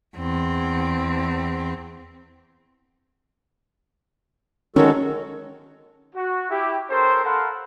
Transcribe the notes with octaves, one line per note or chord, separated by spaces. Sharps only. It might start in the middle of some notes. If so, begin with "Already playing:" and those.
E2 C4
D#3 F#3 G#3 C#4 F#4 A4 C#5
F#4
E4 G4
C#4 G4 A4 A#4 C5
A4 A#4 F5 F#5 B5 C6